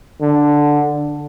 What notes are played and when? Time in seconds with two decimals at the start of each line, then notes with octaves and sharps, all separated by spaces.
0.21 D3